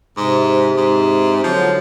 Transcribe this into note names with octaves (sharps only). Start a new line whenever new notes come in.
G#2 C3
G#2
D3 F3 F#3